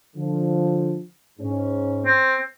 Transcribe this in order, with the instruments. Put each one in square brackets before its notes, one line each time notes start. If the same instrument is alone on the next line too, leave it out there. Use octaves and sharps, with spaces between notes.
[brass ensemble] D3 F3
G#2 C#4
[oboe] C4